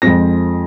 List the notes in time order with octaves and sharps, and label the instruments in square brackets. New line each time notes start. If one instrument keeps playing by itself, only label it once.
[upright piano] F2 F3 G#3 C4 A#6